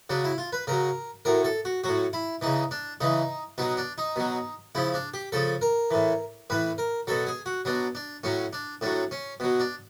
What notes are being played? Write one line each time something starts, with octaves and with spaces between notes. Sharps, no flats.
C#3 F#3 D4
E4
F4
B4
C#3 F#3 A#4
A2 F#3 A#4
A4
F#4
A2 F#3 F#4
E4
C#3 E3 D#4
D4
C#3 E3 D#4
B2 F#3 D#4
D4
D#4
B2 F#3
C#3 F3 E4
D4
G4
C#3 F3 A4
A#4
A2 E3
A2 E3 B4
A#4
B2 F#3 A4
G#4
F#4
B2 F#3 D4
D4
A2 F#3 C#4
D4
A2 F#3 D4
C#4
B2 F#3
D4